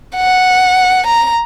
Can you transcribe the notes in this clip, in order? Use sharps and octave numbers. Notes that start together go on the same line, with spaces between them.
F#5
A#5